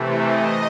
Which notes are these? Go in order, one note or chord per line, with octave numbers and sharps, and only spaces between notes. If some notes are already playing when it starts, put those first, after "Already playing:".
Already playing: C3 E3 A3
D#5